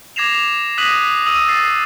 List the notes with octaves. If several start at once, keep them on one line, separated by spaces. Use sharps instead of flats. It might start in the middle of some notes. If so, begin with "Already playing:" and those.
D6 G#6 A#6 C7 E7 F7
D#6 F#6 A#6 B6 D#7 F#7
D#6 E6 D#7
A6 C7